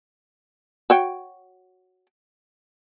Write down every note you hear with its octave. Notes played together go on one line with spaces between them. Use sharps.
F#4 C#5 G5